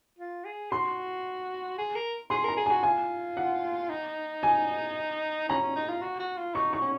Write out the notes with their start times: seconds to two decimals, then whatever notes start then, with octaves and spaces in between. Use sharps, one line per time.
0.19 F4
0.45 G#4
0.71 F#4 C6
1.78 G#4
1.95 A#4
2.30 G#4 C6
2.44 A#4 A#5
2.57 G#4
2.66 G#5
2.71 F#4
2.83 F4 G#5
3.37 F#5
3.90 D#4
4.43 G#5
5.49 C#4 A#5
5.62 C#4
5.76 D#4
5.89 F4
6.02 F#4
6.20 F#4
6.38 F4
6.55 D#4 C#6
6.73 C#6
6.81 C#4